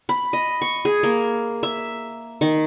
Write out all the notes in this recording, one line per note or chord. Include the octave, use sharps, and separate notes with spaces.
B5
D#5
C#6
G#4
A#3
E5
D#3